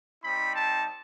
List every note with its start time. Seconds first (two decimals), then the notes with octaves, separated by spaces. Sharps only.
0.23 G3 C4 D#4 B5
0.55 A5